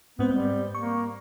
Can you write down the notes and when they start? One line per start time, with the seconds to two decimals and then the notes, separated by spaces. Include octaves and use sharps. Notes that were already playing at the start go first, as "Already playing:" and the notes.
0.19 G#2 B3 C4 C5
0.32 G3
0.75 A#3 C#6